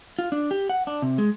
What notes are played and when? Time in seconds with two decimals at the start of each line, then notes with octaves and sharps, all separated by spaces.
0.19 F4
0.32 D4
0.51 G4
0.69 F#5
0.87 D4
1.02 C3
1.18 G#3